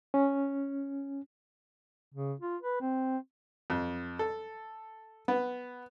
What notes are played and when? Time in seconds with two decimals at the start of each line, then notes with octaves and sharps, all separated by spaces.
0.14 C#4
2.14 C#3
2.40 F4
2.62 B4
2.81 C4
3.70 F2
4.19 A4
5.28 B3